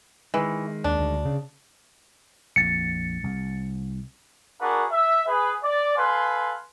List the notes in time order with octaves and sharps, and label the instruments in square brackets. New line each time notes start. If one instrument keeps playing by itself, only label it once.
[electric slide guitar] D#3 G#3 [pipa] E3
[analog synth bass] D#2 [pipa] D4
[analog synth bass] D2
C#3
[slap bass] A#1 F2 [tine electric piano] A6 C#7
[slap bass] C2
[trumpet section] D4 F#4 G#4 A#4 B4 F#5
E5
G#4 B4
D5
A4 B4 F5 G#5 C6